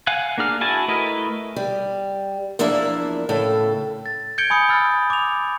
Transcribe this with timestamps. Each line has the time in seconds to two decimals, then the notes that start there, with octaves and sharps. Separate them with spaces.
0.07 F5 F#5 G#5 F#6
0.38 A#3 D4 G#4 F6
0.61 E4 F#4 G#5 A5
0.88 A3 E4 A#4 B4 D#5
1.56 G3
2.59 E2 F3 A#3 D4 E4 E5
3.29 A2 C#3 A4
4.06 A6
4.38 G6 G#6 C#7 D7 G7
4.50 G#5 B5 D#6 C#7
4.69 B5 E6 F6 A6
5.10 D6 F7